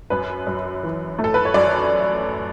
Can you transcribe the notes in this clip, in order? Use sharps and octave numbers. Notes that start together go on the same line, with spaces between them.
F#2 B4
F#2
E3
A3
A4
B4
C#5
F#2 D5